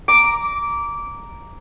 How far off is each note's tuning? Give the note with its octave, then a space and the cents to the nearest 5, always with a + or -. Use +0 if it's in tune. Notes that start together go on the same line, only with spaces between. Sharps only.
A#5 +0 D6 -15